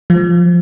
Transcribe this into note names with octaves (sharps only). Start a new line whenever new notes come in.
F3